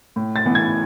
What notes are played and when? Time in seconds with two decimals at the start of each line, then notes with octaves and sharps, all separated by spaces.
0.16 A2
0.36 A6
0.46 E3 B3
0.55 G#6